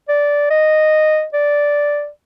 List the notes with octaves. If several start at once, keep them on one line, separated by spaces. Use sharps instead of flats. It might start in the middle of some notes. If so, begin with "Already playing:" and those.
D5
D#5
D5